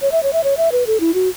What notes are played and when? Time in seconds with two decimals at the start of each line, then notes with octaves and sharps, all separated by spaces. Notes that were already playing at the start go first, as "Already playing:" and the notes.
0.02 C#5
0.12 E5
0.23 C#5
0.33 E5
0.44 C#5
0.57 E5
0.72 B4
0.87 A4
1.00 E4
1.14 F#4